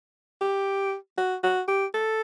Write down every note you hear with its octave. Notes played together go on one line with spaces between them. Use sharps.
G4
F#4
F#4
G4
A4